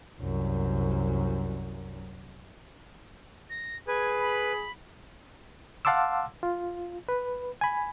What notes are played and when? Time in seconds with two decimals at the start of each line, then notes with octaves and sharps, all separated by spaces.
0.20 C2 F#2
3.50 A#6
3.88 G#4 B4 G#6
4.20 B5
5.85 F5 F#5 A5 C6 D6 E6
6.43 F4
7.09 B4
7.61 G#5 B5